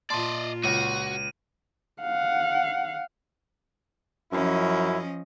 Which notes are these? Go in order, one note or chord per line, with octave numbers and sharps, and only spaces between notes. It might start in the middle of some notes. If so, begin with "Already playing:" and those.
A#2 F4 D5 D#5 A5 C6
C#2 F#4 D#7
F5 F#5
F#2 F3 C#4 E4 D#5